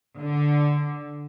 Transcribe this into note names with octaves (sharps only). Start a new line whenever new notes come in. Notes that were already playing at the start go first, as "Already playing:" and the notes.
D3